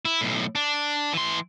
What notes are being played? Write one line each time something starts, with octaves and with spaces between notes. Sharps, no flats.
E4
B1 A2
D4
E3 C6